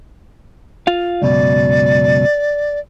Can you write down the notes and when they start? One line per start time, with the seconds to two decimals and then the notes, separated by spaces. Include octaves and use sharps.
0.87 F4 F5
1.22 C#2 F#2 B2 D5